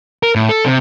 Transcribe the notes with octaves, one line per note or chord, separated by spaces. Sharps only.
A#4
A2
A4
C3